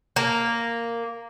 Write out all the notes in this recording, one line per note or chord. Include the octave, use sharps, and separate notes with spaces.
A#3